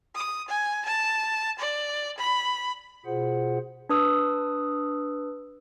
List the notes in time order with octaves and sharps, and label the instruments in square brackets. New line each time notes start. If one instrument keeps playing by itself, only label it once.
[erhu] D#6
G#5
A5
D5
B5
[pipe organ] B2 F4 G#4 C5 F#5
[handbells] D4 B4 D#6 E6